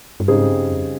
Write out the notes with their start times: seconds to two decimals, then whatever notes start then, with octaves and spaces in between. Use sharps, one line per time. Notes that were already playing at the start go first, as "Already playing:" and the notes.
0.20 G2
0.28 G#2 C#3 G3 C4 D#4 G#4
0.49 G2
0.69 F2